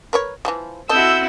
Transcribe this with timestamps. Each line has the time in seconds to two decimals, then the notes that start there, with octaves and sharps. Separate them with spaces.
0.13 A#4 B4 C#5
0.45 E3 F3 G3
0.89 C4 E4 F#4 A4 D#5 E6 G6